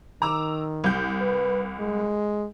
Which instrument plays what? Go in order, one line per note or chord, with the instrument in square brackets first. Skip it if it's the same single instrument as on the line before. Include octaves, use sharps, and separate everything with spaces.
[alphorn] D#3 [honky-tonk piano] A#5 D6 E6
[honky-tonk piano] C2 G6
[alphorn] B4
G#3